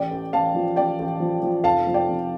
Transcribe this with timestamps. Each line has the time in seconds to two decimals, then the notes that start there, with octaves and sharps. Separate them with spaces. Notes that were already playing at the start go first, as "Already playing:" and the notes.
Already playing: A1 D5 G5
0.11 A1
0.33 A1 F5 A5
0.55 F3
0.76 A1 D5 G5
0.99 A1
1.20 F3
1.43 F3
1.64 F1 F5 A5
1.87 F3
1.94 D5 G5
2.09 F2